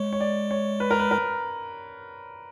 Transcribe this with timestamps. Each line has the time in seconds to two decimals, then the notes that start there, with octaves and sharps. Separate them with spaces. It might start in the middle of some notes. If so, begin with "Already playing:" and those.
Already playing: G#3 C#5
0.13 C#5
0.20 D5
0.51 C#5
0.80 B4
0.91 A#4
1.00 B4
1.11 A#4